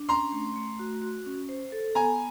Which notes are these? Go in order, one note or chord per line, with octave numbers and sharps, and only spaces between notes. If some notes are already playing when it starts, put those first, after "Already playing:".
Already playing: D4
C#4 A#5 C6
A3
A3
F#4
F#4
C#4
C5
A4
B3 G#5 A#5